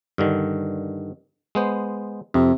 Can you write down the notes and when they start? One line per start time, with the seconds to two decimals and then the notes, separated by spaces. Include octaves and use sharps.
0.18 G2 D3 D#3
1.55 G#3 B3 C5
2.34 F2 C3